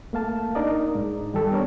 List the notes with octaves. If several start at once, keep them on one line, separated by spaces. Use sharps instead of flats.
A3 A#3 F5 A5
D4 D#4 A#4 D5 D#5
G#2
D#3 G3 G4 A4
B3 D4 A#4 C#5